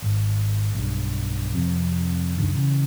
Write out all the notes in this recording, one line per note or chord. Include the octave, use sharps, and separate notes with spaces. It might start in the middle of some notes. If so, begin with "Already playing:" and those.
G#1
B1 G2
F2 C3
C#2 F#2 D3 D#3
C#3 E3